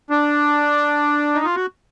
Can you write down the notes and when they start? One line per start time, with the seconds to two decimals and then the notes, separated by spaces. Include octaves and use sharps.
0.10 D4
1.35 D#4
1.45 F4
1.55 F#4